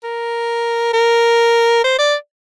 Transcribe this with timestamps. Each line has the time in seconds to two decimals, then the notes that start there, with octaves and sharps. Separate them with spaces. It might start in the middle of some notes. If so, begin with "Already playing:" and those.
0.04 A#4
0.93 A#4
1.84 C5
1.99 D5